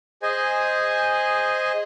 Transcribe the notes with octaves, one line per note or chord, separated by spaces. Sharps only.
G#4 C5 D#5 G#5